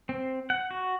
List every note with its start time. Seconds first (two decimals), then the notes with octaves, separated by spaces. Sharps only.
0.09 C4
0.50 F#5
0.71 F#4